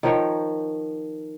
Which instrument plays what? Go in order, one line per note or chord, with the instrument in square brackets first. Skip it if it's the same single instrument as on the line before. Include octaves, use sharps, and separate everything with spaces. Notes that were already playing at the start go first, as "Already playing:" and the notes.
[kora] D#3 F3 C#5 G5